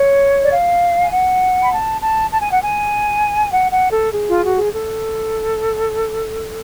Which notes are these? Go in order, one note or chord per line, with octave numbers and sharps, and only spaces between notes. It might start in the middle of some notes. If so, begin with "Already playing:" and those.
Already playing: C#5
D5
F5
G#5
F#5
B5
A5
A5
A5
G#5
F#5
G#5
F#5
F#5
A4
G#4
F4
F#4
G#4
A4